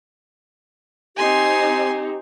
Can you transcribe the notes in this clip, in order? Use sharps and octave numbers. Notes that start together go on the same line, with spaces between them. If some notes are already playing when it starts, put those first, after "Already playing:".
C4 D#4 G4 G#5 C6